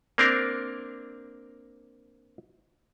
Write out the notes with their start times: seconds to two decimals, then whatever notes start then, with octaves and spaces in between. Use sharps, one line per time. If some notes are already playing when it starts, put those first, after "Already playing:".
0.18 A#3 C4 D4 A#4